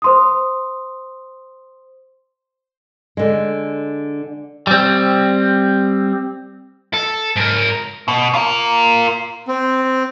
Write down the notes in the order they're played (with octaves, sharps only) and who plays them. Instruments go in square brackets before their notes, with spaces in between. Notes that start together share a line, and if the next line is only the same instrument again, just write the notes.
[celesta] C5 C6 D#6
[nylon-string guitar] D3 G#3
[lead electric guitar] G3 C4
A4
G#2 A#4
B2
F4 A#4
[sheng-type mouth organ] C4